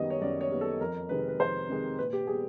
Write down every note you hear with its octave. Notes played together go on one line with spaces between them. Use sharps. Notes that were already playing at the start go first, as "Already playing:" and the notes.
Already playing: F#2 D#3 G3 B3 D#5
C#5
F#2 D5
C#5
D#3 G3 B3
A4
F2 A#4
C3 D#3 G#3 B4
B4
F2 C5
C3 D#3 G#3
A#2 B4
G4
G3 B3 G#4